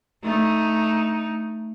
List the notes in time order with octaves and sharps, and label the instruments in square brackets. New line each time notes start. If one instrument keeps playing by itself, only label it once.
[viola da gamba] A3 D#4